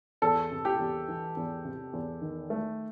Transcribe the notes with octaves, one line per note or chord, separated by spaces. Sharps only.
E2 A4
C3
G4
E2
E3
E2
C3
E2
D#3
A3